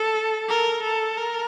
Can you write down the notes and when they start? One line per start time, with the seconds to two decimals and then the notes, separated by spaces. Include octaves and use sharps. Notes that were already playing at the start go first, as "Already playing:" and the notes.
Already playing: A4
0.49 A#4
0.83 A4
1.17 A#4